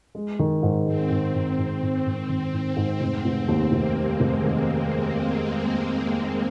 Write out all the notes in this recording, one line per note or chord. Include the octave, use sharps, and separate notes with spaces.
G#3
D#3
G#2
G#3 C4
G#2
G#2
G#2
G#2
G#2
D#3 C4
G#2
G#2
F1
F1
D#2
F1 A#3
G3
G#3
F1
D#3